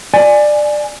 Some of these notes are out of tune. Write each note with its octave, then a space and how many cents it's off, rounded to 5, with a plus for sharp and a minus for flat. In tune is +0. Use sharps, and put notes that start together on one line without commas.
D5 +15 G#5 +0